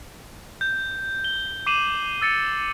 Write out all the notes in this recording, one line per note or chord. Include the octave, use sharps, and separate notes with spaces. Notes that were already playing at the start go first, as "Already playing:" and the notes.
G6
G7
D6 C7 D#7 E7 F#7
E6 A6 C#7